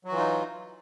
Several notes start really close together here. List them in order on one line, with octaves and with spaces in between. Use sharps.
F#3 F#4 E3 F4 D#4